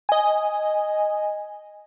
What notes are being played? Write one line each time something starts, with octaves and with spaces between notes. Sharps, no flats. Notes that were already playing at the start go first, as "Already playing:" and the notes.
D#5 G#5